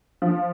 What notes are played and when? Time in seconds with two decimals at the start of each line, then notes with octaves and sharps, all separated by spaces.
0.22 F3